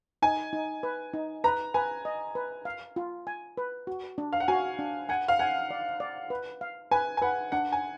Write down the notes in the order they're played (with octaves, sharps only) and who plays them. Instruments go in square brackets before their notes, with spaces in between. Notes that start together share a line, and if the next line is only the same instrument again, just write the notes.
[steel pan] D#4 [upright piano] G#5
[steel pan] D#4
B4
D#4
[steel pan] B4 [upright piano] A#5
[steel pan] B4 [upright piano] G#5
[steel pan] D#5
B4
F5
F4
G#5
B4
F#4
D4
[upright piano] F5
F#5
[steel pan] F#4 [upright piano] G#5
[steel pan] D4
[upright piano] F#5 [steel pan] G#5
[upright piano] F5
[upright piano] F#5 [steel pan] G#5
[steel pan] D5
D5
B4
F5
[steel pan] B4 [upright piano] G#5
[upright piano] G#5
[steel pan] B4 [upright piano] F#5
[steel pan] D4 [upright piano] F#5
[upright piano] G#5